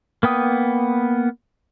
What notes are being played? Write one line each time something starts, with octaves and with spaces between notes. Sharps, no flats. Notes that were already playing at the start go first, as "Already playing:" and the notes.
A#3 B3 G5 D#6